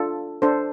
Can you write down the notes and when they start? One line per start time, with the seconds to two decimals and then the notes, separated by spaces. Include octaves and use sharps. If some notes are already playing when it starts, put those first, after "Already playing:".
Already playing: D4 F4 A4
0.42 D4 A4 C5